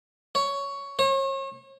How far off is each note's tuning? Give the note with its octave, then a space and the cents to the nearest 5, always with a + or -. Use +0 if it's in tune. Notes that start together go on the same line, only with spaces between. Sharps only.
C#5 +10
C#5 -40